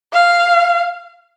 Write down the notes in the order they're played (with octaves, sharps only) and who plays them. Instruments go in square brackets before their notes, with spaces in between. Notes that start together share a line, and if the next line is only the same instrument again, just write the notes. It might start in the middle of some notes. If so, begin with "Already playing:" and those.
[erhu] F5